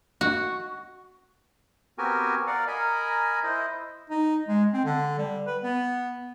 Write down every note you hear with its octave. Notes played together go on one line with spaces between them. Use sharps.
F#4
B3 C4 F#4 G4 A#4 G#5
A#4 D5 F5 F#5
A#4 D#5 G#5 A#5 B5
E4 C5 D#5
D#4
G#3
C4
D3
G3
B4
B3